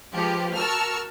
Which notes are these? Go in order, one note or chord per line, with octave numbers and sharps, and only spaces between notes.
F3 G#3 G4 B4
F#4 A#4 A5 C#6 E6 F6